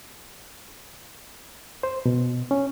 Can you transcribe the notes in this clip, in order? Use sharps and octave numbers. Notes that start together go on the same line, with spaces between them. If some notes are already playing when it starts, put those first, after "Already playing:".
C5
B2
C#4